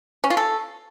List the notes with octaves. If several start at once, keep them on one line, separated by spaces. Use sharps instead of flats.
C#4
F4
A4